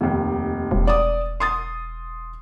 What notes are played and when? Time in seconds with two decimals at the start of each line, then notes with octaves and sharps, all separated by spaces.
0.01 F1 D#2
0.71 E1
0.87 D5 D6 D#6
1.40 C6 D#6 A6